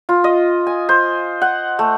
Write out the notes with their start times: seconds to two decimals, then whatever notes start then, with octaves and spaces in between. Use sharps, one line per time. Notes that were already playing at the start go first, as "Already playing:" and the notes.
0.09 F4
0.24 D#5
0.67 G#5
0.89 C5
1.42 F#5
1.79 A3